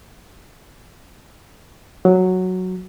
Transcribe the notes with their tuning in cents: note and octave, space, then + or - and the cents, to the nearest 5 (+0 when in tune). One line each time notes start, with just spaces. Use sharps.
F#3 -5